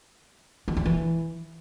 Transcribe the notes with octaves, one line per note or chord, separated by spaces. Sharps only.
D#3
D3
E3